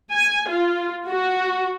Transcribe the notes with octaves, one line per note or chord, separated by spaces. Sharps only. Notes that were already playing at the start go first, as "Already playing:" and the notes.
G#5
F4
F#4